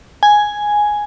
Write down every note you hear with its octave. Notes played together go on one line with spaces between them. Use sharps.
G#5